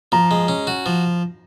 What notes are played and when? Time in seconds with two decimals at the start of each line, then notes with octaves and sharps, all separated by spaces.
0.12 F3 A#5
0.31 G#3
0.48 C#4
0.67 F#4
0.86 F3